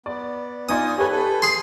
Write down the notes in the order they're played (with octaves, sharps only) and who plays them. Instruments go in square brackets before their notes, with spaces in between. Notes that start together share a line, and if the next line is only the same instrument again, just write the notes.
[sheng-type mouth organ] B3 [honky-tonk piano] D5
[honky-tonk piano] B3 D#4 D5 [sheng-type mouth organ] F4 G#5 [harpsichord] D#6
[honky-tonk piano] G4 B4 [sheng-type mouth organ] A4 C#5 G#5
[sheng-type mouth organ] A4
[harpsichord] G#4 C6